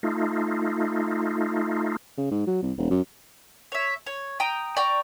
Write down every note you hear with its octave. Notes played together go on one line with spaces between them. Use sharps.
A3 D#4 F4
C#3
G#2
F#3
C2
E1
F#2
C#5 E5
C#5
G5 A#5 D#6
D5 G5 A#5 C#6